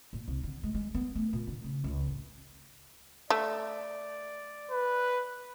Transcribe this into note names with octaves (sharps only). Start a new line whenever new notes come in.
A#2
C2
D3
G#3
G#3
B3
A3
A#2
D3
C#3
C#2
A1
A3 D5
B4